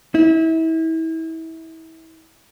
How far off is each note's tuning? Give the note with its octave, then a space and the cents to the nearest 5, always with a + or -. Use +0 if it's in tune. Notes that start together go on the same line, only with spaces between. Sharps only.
E4 -30